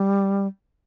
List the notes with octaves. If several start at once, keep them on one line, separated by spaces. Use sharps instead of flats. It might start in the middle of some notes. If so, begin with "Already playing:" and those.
Already playing: G3